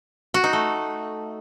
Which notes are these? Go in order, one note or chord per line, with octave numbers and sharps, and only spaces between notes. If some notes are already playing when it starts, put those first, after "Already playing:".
F#4
D#4
A3